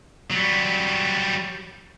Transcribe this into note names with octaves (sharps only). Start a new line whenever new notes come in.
F#3 G3